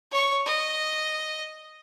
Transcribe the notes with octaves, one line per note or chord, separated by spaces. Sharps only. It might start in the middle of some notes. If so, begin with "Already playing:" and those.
C#5 C#6
D#5